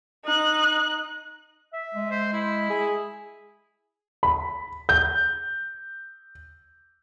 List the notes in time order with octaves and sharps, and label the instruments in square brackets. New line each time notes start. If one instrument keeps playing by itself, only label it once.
[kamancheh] D#4 F#6
[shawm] E5
[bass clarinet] G#3
[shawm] C5
E4
[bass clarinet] G#4
[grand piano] B5
G6